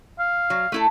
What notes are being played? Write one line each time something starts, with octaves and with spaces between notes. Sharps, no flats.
F5
F#3
A3 E4 A4